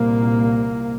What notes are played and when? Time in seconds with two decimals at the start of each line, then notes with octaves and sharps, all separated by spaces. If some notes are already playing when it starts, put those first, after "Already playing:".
Already playing: C2 A#2 A#3